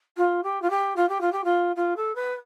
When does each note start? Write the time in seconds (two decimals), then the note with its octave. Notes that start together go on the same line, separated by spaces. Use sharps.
0.17 F4
0.43 G4
0.62 F4
0.70 G4
0.96 F4
1.09 G4
1.21 F4
1.32 G4
1.44 F4
1.76 F4
1.97 A4
2.15 B4